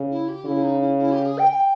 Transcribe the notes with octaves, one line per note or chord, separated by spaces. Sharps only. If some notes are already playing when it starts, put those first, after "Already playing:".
Already playing: C#3
E4
G4
C#3 E4
D#4
E4
E4
G4
G#4
G5
G#5
G5